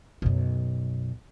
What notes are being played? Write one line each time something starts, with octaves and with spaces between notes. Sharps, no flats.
B1 F#2